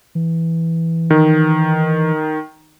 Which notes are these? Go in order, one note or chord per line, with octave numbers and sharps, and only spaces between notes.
E3
D#3